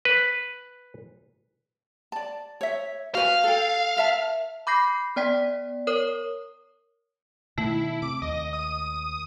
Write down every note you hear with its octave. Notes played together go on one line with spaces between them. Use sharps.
B4
D5 A5
C#5 E5
F#4 B4 F5 G#5
A4 G5
A#4 E5 A5
B5 D6 G6 A#6 C7
B3 D5 G5 B6
A#4 C#5 D#6
B2 D#3 A3 E4
C3 D6
D#2 D#5
D#6